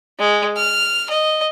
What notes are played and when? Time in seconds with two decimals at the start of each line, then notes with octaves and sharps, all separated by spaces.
0.19 G#3
0.56 F6
1.10 D#5